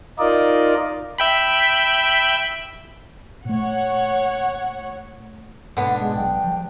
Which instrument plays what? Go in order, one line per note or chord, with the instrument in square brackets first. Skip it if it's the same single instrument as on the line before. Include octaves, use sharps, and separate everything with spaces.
[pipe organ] D#4 F4 A#4 D5 D#5
[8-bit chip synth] E5 G5 B5
[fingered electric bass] A#2 A3 [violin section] C#5 F#5
[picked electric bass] G#2 B2 [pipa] D3 B3 D4
[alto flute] G#3
[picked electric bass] A#1 F#3 [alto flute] G5
[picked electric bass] F3 G3